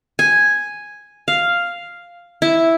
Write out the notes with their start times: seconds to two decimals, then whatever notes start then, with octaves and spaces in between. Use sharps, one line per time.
0.19 G#5
1.28 F5
2.42 E4